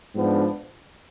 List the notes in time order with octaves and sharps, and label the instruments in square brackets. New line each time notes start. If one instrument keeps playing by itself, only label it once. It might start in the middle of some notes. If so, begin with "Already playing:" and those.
[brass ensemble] G#2 F3 B3 D4